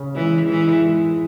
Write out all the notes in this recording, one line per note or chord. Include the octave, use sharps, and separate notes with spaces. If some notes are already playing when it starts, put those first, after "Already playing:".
Already playing: C#3
E3 G#3
E3 G#3
G#3